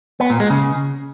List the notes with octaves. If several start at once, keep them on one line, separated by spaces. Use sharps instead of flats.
B3
A#2
G#3
C#3